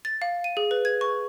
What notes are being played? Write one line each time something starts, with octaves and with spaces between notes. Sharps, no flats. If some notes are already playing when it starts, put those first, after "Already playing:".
A6
F5
D#7
G#4
B4
G#6
C#6